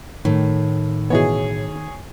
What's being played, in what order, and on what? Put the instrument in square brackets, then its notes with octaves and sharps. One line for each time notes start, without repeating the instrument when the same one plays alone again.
[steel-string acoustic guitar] A2 [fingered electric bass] D#3
[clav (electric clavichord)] B2 E3 B3 [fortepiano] G#4 C#5